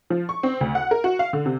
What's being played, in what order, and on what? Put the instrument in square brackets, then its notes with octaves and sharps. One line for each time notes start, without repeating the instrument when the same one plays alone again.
[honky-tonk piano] F3
C#6
C4
D2
F#5
A#4
F#4
F5
D3
C3